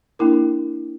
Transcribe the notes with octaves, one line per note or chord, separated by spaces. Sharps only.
A#3 D4 E4 A#4